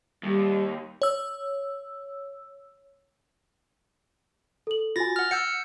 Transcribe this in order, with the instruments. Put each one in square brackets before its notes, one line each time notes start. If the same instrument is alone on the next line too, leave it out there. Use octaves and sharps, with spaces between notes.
[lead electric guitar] D#2 [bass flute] G3
[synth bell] C#5 E6
[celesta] A4 F#7
[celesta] F4 F#4 G#5 [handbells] A6 A#6
[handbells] F#5 F6
[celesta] F#5 [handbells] E6 G6 C#7